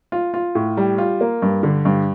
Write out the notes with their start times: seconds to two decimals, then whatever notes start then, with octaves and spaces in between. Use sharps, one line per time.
0.12 F4
0.34 F4
0.55 A2
0.77 G3
0.98 F4
1.21 A#3
1.42 G2
1.63 D3
1.85 G2